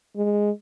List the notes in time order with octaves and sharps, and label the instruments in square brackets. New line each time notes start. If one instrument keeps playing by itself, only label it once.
[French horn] G#3